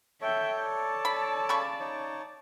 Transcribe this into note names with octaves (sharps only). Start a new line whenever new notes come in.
A4 C#5 E5 G5
D5 A5
B5
C#3 B5 C#6
D#4 C#5